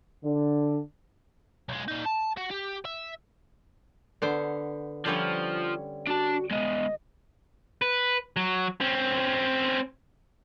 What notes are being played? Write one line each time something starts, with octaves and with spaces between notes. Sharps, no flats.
D3 D4
B1 G#3
A#2 D#4
A5
F#4
G4
E5
D3 B3 C5
D3 F3 G3 C#4
D4 F#4 A5
G#3 B3 D#5
B4
F#3
C4 C#4